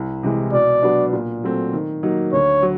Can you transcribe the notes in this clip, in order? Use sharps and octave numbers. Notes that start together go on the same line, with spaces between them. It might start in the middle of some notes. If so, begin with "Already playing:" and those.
Already playing: C2
C3 E3 G#3
B2 D5
F#3 B3 D4 F#4
A#2
F#3 A3 C4
D#3
F#3 A#3 D#4
D2 C#5
F#3